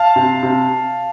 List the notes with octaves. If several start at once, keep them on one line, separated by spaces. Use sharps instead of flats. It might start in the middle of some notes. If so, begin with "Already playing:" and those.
Already playing: F5 A5
C3
C3